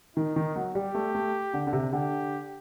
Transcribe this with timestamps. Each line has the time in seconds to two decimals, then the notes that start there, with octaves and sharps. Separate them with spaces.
0.16 D#3 D#4
0.36 D#3
0.56 F#3
0.75 G3 G4
0.95 A3
1.15 A3
1.54 D3
1.67 D3
1.73 C3
1.93 D3 G4